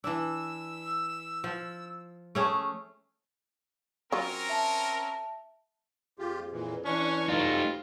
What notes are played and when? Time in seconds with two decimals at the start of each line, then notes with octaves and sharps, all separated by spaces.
0.04 E3 D4 E6
1.44 F3
2.35 A3 C#4 G#4
4.12 F#3 C4 C#4 F4 A#4
4.49 E5 A5
6.19 F2 F4 G4 G#4
6.52 A#2 E3
6.85 E3 C#4 D4 C#6
7.28 G2 F#3 G3 A3 D#4 F4